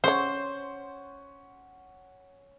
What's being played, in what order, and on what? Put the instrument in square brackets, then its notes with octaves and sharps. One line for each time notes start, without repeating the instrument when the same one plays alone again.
[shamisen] C#3 C#5 [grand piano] C#4 F#5 C#6 [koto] C5